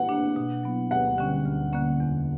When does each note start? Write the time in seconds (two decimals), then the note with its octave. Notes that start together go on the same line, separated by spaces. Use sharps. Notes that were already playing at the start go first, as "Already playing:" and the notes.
Already playing: F#5
0.09 A#3 D4
0.36 B2
0.63 F#3 B3 E4
0.91 D2 F#5
1.18 D3 G3 A#3 C#4
1.45 D2
1.73 D3 A#3 C#4
2.00 E2